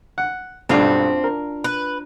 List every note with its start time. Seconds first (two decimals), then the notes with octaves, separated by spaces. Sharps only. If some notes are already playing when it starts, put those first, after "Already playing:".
0.18 F#5
0.69 B1 G2 C4 D4 F4 A5
1.24 A#4
1.64 B4